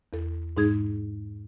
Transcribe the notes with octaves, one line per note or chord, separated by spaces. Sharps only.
E2 A4
G#2 G#3 D#4 G#4 G#6